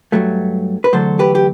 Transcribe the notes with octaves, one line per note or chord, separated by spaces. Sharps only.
G2 F#3 A3
B4
E2 D3 F#3 A3 A4 C5
G4 B4
G4